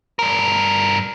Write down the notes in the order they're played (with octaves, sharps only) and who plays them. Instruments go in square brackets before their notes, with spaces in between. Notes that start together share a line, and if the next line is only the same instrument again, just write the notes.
[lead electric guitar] G2 A#4